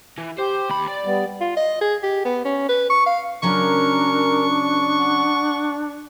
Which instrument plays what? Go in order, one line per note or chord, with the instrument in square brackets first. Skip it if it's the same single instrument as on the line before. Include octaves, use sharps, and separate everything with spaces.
[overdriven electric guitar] E3
[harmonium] G4 [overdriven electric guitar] C5
[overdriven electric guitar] D#2 B5
D5
[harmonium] G3 B3
[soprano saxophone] F4
D#5
G#4
G4
B3
C#4
B4
C#6
F5
[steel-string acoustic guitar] C#3 F#3 C#4 [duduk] D4 [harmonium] A#4 [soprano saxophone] C#6
[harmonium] F#5